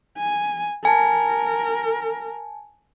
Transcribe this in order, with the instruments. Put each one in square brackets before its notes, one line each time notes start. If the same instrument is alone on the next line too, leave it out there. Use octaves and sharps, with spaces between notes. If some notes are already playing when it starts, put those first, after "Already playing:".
[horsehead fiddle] G#5
[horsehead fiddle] A#4 [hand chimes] G#5 A5